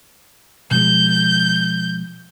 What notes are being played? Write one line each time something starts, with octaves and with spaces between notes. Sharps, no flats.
B2 F3 G#3 G6